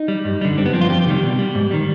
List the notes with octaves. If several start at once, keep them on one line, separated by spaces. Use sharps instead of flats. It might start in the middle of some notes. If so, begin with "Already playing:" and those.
Already playing: D#4
G3
G2
D3 G3
G2 C4
B3
F3 C4
F4
F2 G4
C3 D#3 G3
B2
G3
G#2
D#3 G3